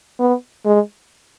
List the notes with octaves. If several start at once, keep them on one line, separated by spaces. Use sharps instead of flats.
B3
G#3